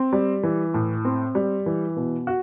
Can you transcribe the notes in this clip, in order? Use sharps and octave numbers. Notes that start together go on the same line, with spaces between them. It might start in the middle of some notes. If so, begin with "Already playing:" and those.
Already playing: C4
G3
E3
A2
C4
G3
E3
B2
F#4